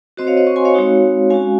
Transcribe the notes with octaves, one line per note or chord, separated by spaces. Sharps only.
C4 F#4 C5 D#5
C#5 F5
C5 D#5
C#6
G#5 C6
C#5 F5
G#3 C4 D#4 F#4
G#3 C#4 F#4 F5 G#5